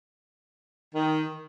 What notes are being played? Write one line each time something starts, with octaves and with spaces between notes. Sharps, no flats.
D#3